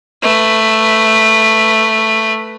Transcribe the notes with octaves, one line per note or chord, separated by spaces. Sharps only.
A3 B4